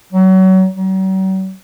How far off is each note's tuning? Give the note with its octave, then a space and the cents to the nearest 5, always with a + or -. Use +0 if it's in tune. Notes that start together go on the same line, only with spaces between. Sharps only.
F#3 +30
F#3 +45